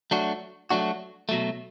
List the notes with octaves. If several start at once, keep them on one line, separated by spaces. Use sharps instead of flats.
F#3 A3 D4 F#4
F#3 A3 D4 F#4
B2 F#3 A3